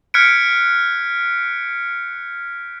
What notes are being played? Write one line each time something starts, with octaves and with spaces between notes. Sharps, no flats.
F6 F#6 G#6 B6 C#7 D7